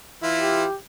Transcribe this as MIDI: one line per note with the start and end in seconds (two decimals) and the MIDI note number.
0.23 0.65 52
0.23 0.65 64
0.23 0.65 65
0.38 0.75 67